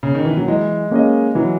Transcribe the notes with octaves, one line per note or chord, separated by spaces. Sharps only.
C#3
D#3
E3
F#3
E3 G#3
A#3 C#4 G#4 D#5
E3 F#3